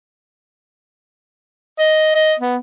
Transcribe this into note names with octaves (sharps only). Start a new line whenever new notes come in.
D#5
D#5
B3